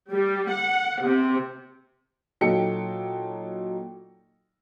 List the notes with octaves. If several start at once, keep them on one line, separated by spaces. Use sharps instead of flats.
G3
F#5
C3
A#2 F#3 D#4 A4 G5 C#7